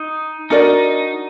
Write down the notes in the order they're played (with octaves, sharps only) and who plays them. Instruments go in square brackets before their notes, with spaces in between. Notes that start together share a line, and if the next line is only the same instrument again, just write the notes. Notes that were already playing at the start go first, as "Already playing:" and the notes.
Already playing: [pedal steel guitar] D#4
[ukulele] D4 F#4 A#4 D5 [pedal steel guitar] D#4